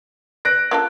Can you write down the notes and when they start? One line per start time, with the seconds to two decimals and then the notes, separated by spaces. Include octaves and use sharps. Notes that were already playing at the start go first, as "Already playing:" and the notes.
0.45 F#6 A#6 D7
0.71 A#3 F4 A4